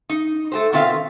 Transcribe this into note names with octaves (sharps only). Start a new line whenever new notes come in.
D#4
A3 G4 C5
B2 D#3 C4 F4 E5 F5